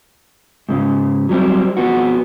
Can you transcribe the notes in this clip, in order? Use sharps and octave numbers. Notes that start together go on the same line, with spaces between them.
G#2 C#3
F#3 G3 B3 C4
F2 B3 F#4